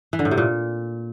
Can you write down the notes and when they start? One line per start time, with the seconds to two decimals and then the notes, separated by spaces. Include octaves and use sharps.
0.13 E3
0.19 D3
0.25 A2
0.31 C3
0.38 A#2